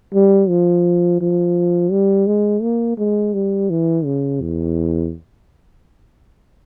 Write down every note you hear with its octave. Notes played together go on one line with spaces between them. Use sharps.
G3
F3
F3
G3
G#3
A#3
G#3
G3
E3
C#3
E2